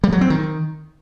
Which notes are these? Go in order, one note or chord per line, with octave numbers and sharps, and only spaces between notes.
G3
F#3
C4
D#3